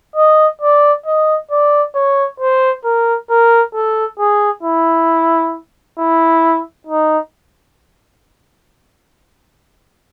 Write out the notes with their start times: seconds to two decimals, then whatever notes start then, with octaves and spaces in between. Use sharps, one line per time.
0.16 D#5
0.61 D5
1.06 D#5
1.51 D5
1.95 C#5
2.40 C5
2.84 A#4
3.30 A#4
3.74 A4
4.19 G#4
4.63 E4
5.98 E4
6.87 D#4